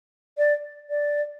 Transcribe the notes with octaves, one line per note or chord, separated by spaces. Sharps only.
D5
D5